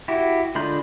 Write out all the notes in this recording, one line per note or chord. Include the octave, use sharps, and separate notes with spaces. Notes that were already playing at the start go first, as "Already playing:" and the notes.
E4 F#4 G4
D3 G#3 F4 B5 G6